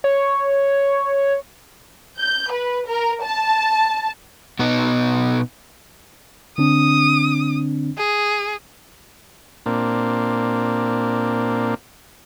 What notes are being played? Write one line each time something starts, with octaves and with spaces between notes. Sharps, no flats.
C#5
G6
B4
A#4
A5
B2 B3 D#4
D3 C4 D4 D#6
G#4
A#2 A#3 C4 D4